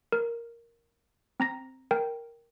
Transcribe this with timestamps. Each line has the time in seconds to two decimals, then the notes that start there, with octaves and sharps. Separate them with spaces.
0.12 A#4
1.40 C4 A#5 A#6
1.91 A#4 G5